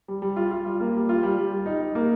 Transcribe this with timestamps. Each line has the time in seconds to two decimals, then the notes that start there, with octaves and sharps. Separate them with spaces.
0.08 G3
0.22 G3
0.36 F4
0.51 F4
0.66 G3
0.80 A#3
0.94 G3
1.09 F4
1.23 G3
1.38 G3
1.52 G3
1.66 D#4
1.80 D#4
1.95 A#3